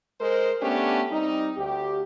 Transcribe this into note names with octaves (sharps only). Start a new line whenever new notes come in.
G#3 A#4 C5
A3 B3 C#4 D4 G4
G3 C4 D#4
D2 G4